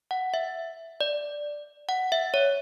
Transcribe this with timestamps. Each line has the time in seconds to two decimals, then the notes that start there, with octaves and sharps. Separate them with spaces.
0.11 F#5
0.34 E5
1.01 D5
1.89 F#5
2.12 E5
2.34 C#5